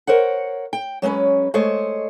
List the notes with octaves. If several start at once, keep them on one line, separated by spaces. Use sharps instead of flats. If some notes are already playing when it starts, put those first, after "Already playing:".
A#4 C5 C#5 F#5
G5
F#3 G#3 C4 C#4 B4
G#3 A3 C5 C#5 D#5